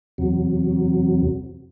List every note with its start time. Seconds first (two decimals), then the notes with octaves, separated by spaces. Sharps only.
0.18 E2 C3 F#3